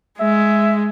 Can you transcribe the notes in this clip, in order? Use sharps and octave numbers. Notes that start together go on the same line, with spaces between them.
G#3 E5